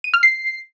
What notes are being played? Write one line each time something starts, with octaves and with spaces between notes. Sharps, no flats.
D#7
F6
C7